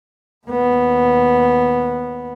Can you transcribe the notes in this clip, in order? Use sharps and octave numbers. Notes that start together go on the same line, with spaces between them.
D#2 B3